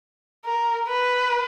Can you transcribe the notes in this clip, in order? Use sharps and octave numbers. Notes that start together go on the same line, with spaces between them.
A#4
B4